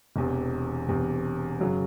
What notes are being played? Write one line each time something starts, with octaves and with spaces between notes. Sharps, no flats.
E1 E2 C3
E1 E2 C3
F#2 C#3 F#3